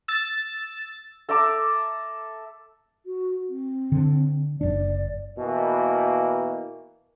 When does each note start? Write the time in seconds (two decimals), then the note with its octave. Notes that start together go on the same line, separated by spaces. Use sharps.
0.08 E6 A6
1.29 A4 E5 A#5 D6
3.06 F#4
3.49 C4
3.92 D3
4.61 F#1 D4 D5
5.39 B2 E3 A#3